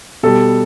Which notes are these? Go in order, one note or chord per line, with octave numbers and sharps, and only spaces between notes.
B2 G3 A4